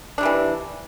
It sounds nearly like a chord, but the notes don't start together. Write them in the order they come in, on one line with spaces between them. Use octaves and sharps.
D4 C3 G3 E3